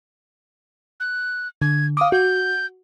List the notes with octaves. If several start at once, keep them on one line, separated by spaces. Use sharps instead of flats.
F#6
D3 G#6
F5 D6 D#6
F#4 G6